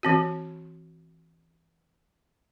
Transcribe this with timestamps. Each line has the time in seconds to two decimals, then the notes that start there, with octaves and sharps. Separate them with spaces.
0.03 E3 C4 F#4